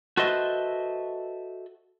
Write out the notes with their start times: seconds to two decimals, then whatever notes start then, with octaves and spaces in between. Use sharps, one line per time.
0.17 F#4 A4 B4 C5 D#5 E5